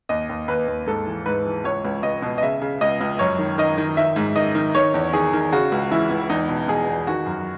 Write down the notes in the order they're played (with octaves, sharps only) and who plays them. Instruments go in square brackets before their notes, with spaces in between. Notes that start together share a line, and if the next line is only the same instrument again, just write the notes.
[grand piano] D#2 D#5
D#2
D#2 B4
D#2
G#2 A4
E3
G#2 B4
E3
C#2 C#5
C#2
C#2 D#5
B2
D#5
C#3 E5
C#3
C#2 D#5
C#2
F#2 C#5
D#3
D#3 D#5
D#3
D#3 E5
G#2
D#3 D#5
D#3
D#3 C#5
E2
D#3 G#4
D#3
C#3 F#4
C#2
E3 E4
C#2
E2 D#4
B2
B2 G#4
E2
D#3 F#4
F#2